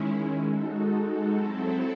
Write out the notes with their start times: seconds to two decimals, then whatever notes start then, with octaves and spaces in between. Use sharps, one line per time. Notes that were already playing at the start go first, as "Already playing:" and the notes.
Already playing: D#3 G#3 C#4 E4
0.44 G#3 D#4 F#4 A4
1.34 F#3 C4 E4 A4